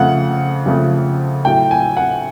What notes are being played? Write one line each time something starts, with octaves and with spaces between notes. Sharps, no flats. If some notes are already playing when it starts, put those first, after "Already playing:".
Already playing: F2 C#3 F3 A3 F#5
F2 C#3 F3 A3
A2 F#3 A3 G5
G#5
F#5